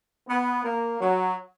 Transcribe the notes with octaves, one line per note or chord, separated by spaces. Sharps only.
B3
A#3
F#3